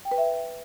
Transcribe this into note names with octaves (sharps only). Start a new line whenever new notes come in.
G5
B4
E5